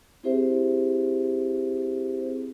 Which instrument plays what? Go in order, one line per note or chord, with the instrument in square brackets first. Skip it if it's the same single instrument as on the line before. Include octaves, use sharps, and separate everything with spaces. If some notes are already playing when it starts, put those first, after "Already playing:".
[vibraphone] C4 E4 G4 G#4 C5 E5